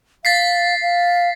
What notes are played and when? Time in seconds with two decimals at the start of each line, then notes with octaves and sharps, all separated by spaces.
0.25 F5 A6 B6 C7
0.82 F5